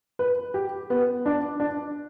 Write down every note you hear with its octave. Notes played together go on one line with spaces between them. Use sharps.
B4
G4
B3
D4
D4